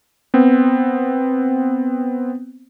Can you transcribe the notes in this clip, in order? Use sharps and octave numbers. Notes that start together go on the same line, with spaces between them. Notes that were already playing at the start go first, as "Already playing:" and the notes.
B3 C4